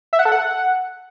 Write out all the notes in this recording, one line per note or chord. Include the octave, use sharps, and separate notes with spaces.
E5
F#5
A4
F#5